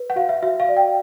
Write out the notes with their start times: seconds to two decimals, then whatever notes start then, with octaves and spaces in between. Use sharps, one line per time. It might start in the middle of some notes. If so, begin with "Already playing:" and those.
Already playing: B4
0.10 F#5
0.16 F#4 F5
0.29 E5
0.43 F#4 E5
0.60 F5
0.69 D5
0.77 G5